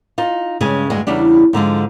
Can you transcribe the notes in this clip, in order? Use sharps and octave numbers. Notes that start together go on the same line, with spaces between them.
D#4 F4
G2 C#3 G#3 C#4 G#4 G#5
D2 G2 G#3 D4 G#4
E2 C#3 G3 D4
G#2 D3 F3 G#3